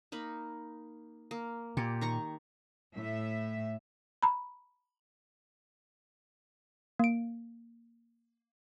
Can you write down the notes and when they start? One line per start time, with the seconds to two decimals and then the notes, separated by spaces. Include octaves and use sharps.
0.12 A#3 D#4 B5
1.31 A#3
1.77 A#2 G4
2.01 D#3 A#5 C#6
2.95 A2 E5
4.22 A#5 B5
6.99 A#3 D7